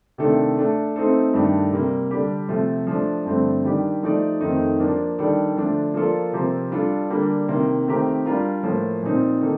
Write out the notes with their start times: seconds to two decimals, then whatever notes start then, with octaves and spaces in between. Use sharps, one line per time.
0.18 C3 D#3 A3 D4 A4
0.57 A3 D4 A4
0.96 A3 C4 D#4 A4 C5
1.34 G2 D#3 A3 D4 A4
1.72 C3 G3 A#3
2.11 D3 G3 D4 G4
2.49 C3 F3 A3
2.87 F3 A3 D4
3.25 G2 D3 F3 A3 C4
3.64 D#3 G3 D4 G4
4.03 F3 A3 D#4 G4 D5
4.41 F2 D#3 A3 C4 D#4
4.80 F3 A#3 D4
5.18 D#3 G3 D4 A4 D5
5.56 D3 F3 A3 D4
5.94 F3 A#3 F4 A4 D5
6.33 C3 F3 C4 G4 A#4
6.71 G3 D4 F4 A4
7.10 D3 G3 A#3 D4
7.48 C3 D#3 A#3
7.87 D#3 A3 C4 G4 A#4
8.26 G3 D4 F4 A#4
8.63 A2 F3 A#3
9.03 A#2 F3 C4 D#4
9.41 D#3 A#3 D#4 A4